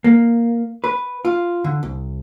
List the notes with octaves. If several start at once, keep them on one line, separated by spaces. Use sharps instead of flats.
A#3
B4
F4
D3
C2